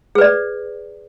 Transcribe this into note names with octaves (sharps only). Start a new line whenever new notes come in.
G#4 B4 D5